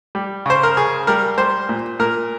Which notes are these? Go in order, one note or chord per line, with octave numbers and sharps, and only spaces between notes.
G3
C#3 C5
A#4
C#3 G#4
G3 A#4
G3 C5
A#2
A#2 A#4